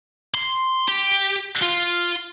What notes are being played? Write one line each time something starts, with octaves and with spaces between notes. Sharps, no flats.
C6
G4
F4